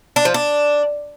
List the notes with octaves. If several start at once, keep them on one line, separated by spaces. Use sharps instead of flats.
D4
F3
D4